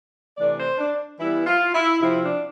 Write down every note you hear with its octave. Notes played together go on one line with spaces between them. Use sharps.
C3 E3 A3 D4 D5
C5
D4
E3 G3 B3 E4
F4
E4
C3 F3 C4 E4
D4